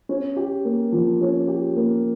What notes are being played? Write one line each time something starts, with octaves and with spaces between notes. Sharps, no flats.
C#4
G4
A#3
F3
C#4
G4
A#3